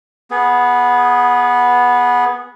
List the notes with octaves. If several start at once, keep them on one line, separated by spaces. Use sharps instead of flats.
B3 G#4